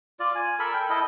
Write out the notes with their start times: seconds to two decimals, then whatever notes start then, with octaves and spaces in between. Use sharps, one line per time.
0.20 F4 D5
0.35 G#5
0.60 A4 A#4 B5
0.74 G5
0.90 E4 A4 D#5